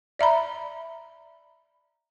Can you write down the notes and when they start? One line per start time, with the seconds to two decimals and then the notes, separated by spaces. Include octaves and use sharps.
0.19 D5 E5 A#5 B5